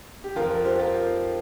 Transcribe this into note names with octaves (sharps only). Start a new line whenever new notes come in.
G4
F2 F3 F4 A#4
F4 A#4
G4 C5
F4 A#4